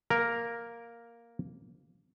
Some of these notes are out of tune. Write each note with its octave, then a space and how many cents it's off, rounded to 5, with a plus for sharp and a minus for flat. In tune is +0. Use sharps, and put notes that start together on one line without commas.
A#3 +0 A#4 +0